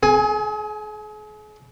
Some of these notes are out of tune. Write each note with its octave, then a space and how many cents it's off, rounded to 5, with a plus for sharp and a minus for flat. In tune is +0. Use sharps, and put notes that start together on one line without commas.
G#4 +40 G#5 +5